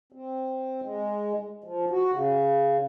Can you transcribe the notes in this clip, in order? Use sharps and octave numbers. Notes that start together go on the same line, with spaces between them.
C4
G#3
F3
F#4
C#3